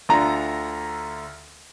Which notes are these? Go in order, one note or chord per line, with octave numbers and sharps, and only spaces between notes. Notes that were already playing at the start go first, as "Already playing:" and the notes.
D2 D3 F4 A#5